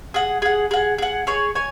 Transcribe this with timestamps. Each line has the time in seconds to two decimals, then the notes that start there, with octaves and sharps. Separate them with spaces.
0.14 G#4 F#5
0.42 G#4 F#5
0.71 G#4 F#5
0.98 G#4 F#5
1.27 G#4 C#5 G#5
1.55 C#5 G#5